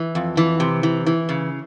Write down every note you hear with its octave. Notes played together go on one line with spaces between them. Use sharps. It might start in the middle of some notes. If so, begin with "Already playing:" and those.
Already playing: E3
F2
E3
C3
E3
E3
C#3